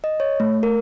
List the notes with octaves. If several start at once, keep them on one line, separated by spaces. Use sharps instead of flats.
D#5
C#5
A3
A#4